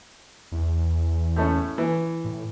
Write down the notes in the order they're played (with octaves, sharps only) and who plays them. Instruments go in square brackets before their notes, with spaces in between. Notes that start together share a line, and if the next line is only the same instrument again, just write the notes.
[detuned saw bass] E2
[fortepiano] A2 A3 C#4
E3
[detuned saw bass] A2